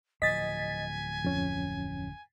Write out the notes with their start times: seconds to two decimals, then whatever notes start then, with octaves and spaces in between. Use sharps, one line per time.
0.22 D1 F3 D#5 G#5 A6 B6
1.24 F2 C#4